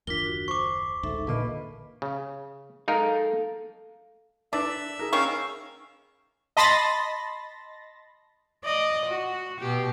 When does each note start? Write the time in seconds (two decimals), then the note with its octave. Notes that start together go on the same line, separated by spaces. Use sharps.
0.07 F#1 D#2 D4 F4 A#4 B6 G7
0.26 F#4
0.48 C5 C#6 D6
1.03 A1 D2 G#2 D#4 A4 E5
1.27 A#2 D3 A#3 B4 D#5 B5
2.02 C#3
2.88 G#3 D#4 A4 A#4 F5
4.53 D4 B4 D5 E5
4.99 G#4 A#4
5.13 D#3 A#3 C#4 F5 C#6 E6
6.57 D#5 A5 B5 C6 A6 A#6
8.64 D5 D#5
9.06 F#4
9.59 B2 G4